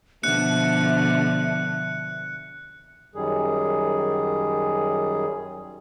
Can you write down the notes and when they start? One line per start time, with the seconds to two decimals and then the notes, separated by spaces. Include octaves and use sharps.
0.23 B2 D3 F3 E5 F#6 C#7
3.15 F#2 D#3 G3 G#4